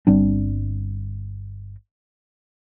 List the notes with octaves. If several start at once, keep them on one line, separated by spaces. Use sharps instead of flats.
G1 G3 C4 D4